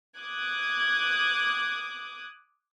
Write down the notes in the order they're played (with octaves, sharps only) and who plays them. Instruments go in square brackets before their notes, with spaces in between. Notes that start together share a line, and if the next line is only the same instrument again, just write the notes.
[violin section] D6 D#6 F#6 G#6